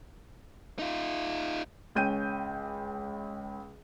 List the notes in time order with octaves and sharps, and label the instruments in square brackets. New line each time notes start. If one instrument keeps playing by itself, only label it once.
[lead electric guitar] D#4 F4
[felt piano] C#2 C#4 G5 G6 D#7